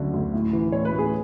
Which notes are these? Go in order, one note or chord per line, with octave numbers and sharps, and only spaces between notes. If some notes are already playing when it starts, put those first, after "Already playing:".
Already playing: D2 D3 F#3
D2
A2
E3
A2 C#5
B4
A2
G#4